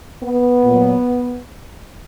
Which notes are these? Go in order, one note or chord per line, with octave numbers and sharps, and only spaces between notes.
B3
A#2 F#3